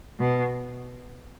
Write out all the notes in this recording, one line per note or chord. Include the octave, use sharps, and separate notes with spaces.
B2